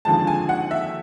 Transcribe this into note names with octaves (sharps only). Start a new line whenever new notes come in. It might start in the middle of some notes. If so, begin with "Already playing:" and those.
D#2 D3 F3 G#3 A5
G#5
F#5
E5